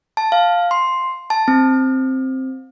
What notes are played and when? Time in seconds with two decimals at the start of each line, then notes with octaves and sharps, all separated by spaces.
0.17 A5
0.32 F5
0.71 C6
1.30 A5
1.48 C4